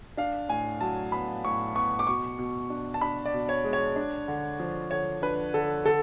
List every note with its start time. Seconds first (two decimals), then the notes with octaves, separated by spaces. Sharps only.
0.17 D4 F5
0.49 A2 G#5
0.81 F#3 A5
1.12 B3 B5
1.44 A2 C#6
1.75 B3 C#6
1.99 D6
2.07 B2 C#6
2.39 B2
2.70 D4
2.94 A5
3.01 D4 B5
3.26 D5
3.33 B2
3.49 C#5
3.64 G#3
3.73 C#5
3.96 D4
4.28 D3
4.60 F3
4.91 D3 C#5
5.22 D4 B4
5.54 D3 A4
5.85 D3 A4